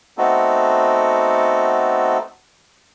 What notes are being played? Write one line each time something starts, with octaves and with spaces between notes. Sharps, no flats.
A3 B3 C4 D#4 F#4 A4